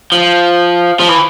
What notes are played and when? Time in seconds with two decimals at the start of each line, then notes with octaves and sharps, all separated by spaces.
0.12 F3
1.00 F3
1.09 E3